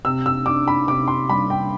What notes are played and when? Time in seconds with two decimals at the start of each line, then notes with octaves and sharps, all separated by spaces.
0.05 C3 E6
0.26 E6
0.46 D4 D6
0.68 B5
0.87 C3 D6
1.08 C6
1.29 G3 B5
1.50 G5